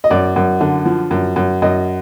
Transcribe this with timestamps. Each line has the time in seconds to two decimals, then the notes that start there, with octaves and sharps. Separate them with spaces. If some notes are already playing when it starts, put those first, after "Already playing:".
0.04 D#5
0.10 F#2 D5
0.36 F#2
0.61 D3
0.85 F3
1.11 F#2
1.36 F#2
1.62 F#2 D#5